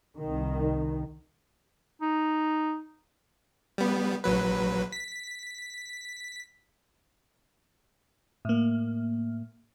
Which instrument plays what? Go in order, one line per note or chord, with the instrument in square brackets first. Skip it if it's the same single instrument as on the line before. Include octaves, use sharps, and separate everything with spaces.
[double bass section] C2 D#3
[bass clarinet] D#4
[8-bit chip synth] G3 B3
A#1 F#3 B4
B6
[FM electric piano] A2 A#3